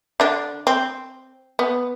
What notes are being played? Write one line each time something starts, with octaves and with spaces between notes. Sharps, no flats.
D3 D4
C4
B3